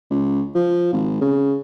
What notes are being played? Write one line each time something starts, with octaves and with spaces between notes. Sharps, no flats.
C#2
F3
G#1
C#3